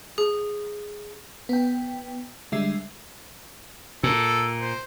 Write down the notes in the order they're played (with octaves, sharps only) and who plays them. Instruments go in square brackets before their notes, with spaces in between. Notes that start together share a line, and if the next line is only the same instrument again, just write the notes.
[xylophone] G#4
[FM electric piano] B3 G5
D3 G3 G#3 E5 C7
[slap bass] A#2 [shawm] A4
[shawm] C5